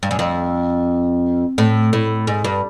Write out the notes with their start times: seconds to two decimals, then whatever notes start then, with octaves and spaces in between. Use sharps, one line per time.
0.03 G2
0.11 F#2
0.19 F2
1.58 A2
1.93 A2
2.27 G#2
2.44 G2